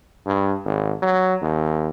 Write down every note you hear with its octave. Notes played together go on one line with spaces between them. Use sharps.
G2
G#1
F#3
D#2